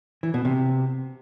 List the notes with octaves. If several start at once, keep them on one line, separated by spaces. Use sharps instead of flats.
E3
B2
C3